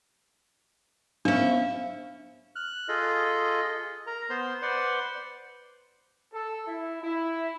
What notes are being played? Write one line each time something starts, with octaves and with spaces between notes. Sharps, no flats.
B3 C#4 D4 C5 E5 F5
F6 F#6
F4 G#4 A4 D#5
A#4 A#5
B3 C5 C6
B4 C5 D5 F#5 C6
A4
E4
E4